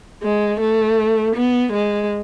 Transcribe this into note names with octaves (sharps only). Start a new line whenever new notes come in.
G#3
A3
B3
G#3